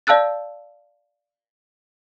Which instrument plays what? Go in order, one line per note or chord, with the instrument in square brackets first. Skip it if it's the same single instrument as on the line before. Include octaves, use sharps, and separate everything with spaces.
[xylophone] D5 F5 A5 E6 F#6 A6